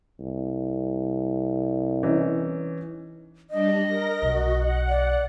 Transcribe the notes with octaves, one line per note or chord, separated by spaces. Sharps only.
C2
E3 C#4 D#4
G3 D4 D#5
A#4 A#6
B1 F#4
F#5
D5